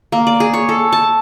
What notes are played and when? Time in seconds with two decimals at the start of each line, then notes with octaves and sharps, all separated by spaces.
0.12 A#3
0.27 D5
0.40 G#4
0.53 C#5
0.69 A4
0.93 A5